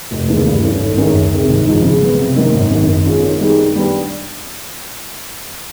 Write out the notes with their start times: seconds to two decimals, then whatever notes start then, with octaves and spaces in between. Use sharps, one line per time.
0.11 F1
0.28 D#2 C#3 E3
0.46 G2
0.63 E3 A3 C#4
0.80 G#1
0.98 F#2 D#3 G#3 C#4
1.15 D2
1.32 C3 D#3 G#3
1.50 G#1
1.67 G#2 F3
1.84 C#3
2.02 F#3 B3
2.19 C3
2.36 D#3 F#3 A#3 C#4
2.54 G#1
2.71 F#2 D#3
2.88 D#3
3.06 G#3 C#4 F4
3.23 D#3
3.40 G3 B3 D#4 G#4
3.58 D#3
3.75 G3 B3 D4